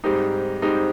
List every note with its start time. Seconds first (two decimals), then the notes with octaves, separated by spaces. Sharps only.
0.04 G#2 G3 C4 D#4 G4
0.62 G#2 G3 C4 D#4 G4